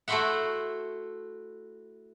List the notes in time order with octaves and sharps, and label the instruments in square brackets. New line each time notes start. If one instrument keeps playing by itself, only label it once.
[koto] A3 E4 F#4 C5 E5 F#5